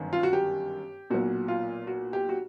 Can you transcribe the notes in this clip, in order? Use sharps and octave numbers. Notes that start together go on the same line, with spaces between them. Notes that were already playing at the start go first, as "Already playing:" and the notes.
Already playing: G1 F#2 D#3
F4
F#4
G4
B1 A#2 F#4
F4
F#4
G4
F#4